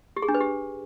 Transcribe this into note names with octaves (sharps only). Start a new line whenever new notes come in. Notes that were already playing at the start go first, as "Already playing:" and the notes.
G4
G#4
D4
B4
G4